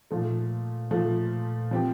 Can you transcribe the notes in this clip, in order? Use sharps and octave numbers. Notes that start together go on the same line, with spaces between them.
A#2 F3 A3
A#2 F3 A3
F3 C4 G4